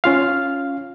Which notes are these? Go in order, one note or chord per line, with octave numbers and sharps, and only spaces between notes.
C#4 F4 F5